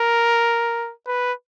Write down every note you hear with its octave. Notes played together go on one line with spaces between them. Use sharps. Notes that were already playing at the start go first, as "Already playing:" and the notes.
Already playing: A#4
B4